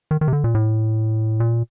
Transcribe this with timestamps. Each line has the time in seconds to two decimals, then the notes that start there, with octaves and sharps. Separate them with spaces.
0.11 D#3
0.21 D#3
0.28 C3
0.33 D3
0.44 A#2
0.55 A2
1.40 A#2